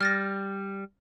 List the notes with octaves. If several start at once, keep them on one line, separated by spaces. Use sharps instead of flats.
G3 F6 A6 A#6